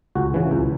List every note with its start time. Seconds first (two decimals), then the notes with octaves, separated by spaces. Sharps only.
0.15 C#2 F#4
0.34 C#3 E3
0.51 C#2